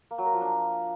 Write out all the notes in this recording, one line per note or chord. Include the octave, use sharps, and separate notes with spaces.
A#3
F#3
A#4
F3
D4